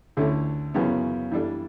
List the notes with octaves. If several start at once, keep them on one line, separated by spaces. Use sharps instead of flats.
D2 D3 A3 C#4 E4
F#2 C#3 E3 B3
E3 G3 D4 A4